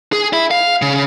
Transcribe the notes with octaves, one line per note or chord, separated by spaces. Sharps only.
G#4
E4
F5
C#3